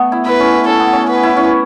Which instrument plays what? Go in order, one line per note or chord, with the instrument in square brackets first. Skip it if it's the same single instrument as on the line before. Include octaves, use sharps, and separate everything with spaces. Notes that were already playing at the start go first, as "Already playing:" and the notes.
Already playing: [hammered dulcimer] A3 B3
E4
[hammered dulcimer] E4 [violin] B4
[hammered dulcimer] C#4
E4
[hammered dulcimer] C#4 [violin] A4
[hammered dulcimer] B3
C#4
[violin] B4
[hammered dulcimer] E4
C#4